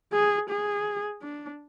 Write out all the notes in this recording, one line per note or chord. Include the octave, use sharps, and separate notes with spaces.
G#4
G#4
D4